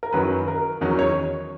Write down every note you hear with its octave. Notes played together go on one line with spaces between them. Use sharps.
A#4
F#2 D#3 F#3 B4
A#4
E2 D#3 F#3 C#4
C#5